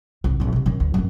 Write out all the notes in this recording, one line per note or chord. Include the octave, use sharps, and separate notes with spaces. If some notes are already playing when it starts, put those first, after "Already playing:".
C2
A#1 D#4
C3 D#3
F#2 D#3
D2
F#2 E3